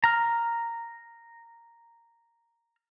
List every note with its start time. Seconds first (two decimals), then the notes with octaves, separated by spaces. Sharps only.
0.04 A#5 F6